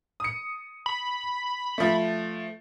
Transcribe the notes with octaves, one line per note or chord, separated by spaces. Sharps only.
D#6 C#7
B5
F3 A3